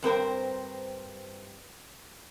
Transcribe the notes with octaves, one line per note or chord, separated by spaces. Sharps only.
G2 C4 A#4 C5